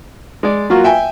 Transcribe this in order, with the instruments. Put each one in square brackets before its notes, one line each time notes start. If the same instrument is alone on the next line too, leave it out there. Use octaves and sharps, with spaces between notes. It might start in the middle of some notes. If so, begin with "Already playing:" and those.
[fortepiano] G#3 D5
F#3 A#3 F4 F#4
E5 G5 G#5